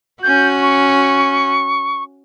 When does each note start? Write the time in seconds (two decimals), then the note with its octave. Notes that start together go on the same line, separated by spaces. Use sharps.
0.23 C#4 F#4 G6
0.62 C#6